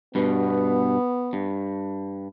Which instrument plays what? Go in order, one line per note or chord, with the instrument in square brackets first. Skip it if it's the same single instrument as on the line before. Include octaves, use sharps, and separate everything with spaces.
[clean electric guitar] G2 B2 [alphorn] B3
[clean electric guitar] G2